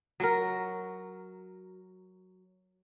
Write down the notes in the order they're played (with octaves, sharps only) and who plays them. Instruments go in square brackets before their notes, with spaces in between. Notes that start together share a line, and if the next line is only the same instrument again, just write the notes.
[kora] F#3 F#4 A#4